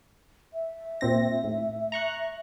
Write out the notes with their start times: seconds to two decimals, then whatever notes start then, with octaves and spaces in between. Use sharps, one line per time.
0.53 E5
1.01 A#2 C4 A#6
1.44 A2
1.92 A#5 C#6 F#6